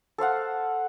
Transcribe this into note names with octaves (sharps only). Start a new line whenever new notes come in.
A4 C5 F5 F#5